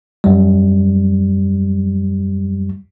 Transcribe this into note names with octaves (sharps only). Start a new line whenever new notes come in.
F#2 G3